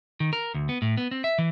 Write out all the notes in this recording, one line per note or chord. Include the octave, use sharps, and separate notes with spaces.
D#3
A#4
D2
B3
A2
B3
C4
E5
E3